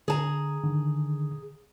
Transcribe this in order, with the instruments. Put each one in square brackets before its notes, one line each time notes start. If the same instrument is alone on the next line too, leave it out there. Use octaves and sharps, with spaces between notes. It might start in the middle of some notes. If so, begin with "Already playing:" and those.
[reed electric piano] D3 [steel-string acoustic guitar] G#4 A5 A#5
[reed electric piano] D3 D#3